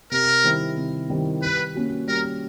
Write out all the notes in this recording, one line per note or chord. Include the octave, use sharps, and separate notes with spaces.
C3 A#4
D#3 G3 C4 E4
C3
D#3 G3 C4 E4
G3 B4
A#3 C#4 F#4
G3 A#4